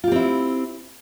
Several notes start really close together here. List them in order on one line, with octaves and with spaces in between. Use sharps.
F4 G4 C4 E4